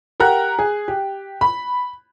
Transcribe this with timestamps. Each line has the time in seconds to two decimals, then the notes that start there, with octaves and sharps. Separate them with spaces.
0.20 G4 A#4 F#5 A#5 F#6
0.59 G#4
0.88 G4
1.41 B5